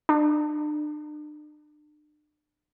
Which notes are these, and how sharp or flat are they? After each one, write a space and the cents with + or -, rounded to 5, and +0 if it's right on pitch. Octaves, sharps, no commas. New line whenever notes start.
D4 +40